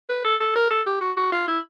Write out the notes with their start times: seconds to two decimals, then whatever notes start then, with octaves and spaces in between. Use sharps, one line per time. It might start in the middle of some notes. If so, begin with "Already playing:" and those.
0.09 B4
0.24 A4
0.40 A4
0.55 A#4
0.70 A4
0.86 G4
1.01 F#4
1.17 F#4
1.32 F4
1.47 E4